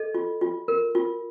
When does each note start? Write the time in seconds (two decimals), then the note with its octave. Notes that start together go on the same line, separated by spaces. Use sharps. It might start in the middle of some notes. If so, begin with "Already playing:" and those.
Already playing: A4 D#5
0.15 F4
0.41 F4
0.68 A#4
0.95 F4